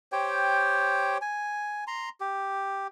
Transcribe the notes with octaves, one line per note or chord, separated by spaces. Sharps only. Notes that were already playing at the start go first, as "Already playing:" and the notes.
G4 C5 C#5 G5
G#5
A#5 C6
G4